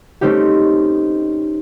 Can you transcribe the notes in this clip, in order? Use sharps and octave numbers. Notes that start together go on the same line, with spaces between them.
A3 C4 C#4 D#4 G4